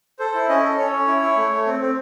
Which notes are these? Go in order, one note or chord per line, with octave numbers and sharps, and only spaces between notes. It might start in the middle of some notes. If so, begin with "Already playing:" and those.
A4 C5
E4
C#4 D#5
A4
C#4 C#5
C#4
E4
E4
A3
A3
C4
C4